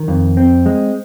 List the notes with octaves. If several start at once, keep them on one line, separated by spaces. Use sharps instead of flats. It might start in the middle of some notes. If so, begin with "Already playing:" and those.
Already playing: D#3
F2
C4
G#3